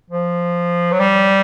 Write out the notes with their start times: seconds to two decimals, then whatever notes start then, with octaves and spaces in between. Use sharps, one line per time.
0.10 F3
0.92 F#3
1.00 G3